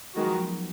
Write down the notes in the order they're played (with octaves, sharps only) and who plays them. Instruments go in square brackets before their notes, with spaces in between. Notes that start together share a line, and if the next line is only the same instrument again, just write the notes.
[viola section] D#3 G#3 B3 F#4 [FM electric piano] F#3
[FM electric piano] F3
F#3